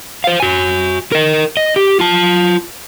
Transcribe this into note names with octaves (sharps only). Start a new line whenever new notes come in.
C5 F5
F#4 G#5
A#4 D#5
D#5
G4
F4 A5